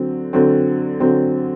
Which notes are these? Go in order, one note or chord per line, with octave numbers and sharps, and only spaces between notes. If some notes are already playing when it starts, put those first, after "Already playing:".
Already playing: D3 F#3 C4
D3 F#3 C4
D3 F#3 C4